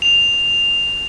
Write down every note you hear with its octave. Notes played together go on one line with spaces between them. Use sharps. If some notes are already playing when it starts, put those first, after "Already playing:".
F7